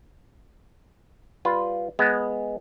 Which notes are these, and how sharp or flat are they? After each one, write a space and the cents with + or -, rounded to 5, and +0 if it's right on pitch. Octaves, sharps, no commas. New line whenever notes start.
G3 -5 F4 +0 B4 +0
G#3 +0 B3 +0